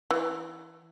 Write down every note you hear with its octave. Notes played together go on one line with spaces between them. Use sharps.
E3